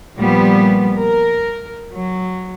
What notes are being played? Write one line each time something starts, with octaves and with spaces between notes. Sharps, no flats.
A#2 F3 G3 B3
A#4
F#3